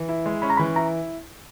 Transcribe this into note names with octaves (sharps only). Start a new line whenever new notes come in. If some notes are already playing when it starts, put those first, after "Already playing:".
Already playing: E3
E4
G#3
C#4 B5
A#5
E3 B5
E4 A#5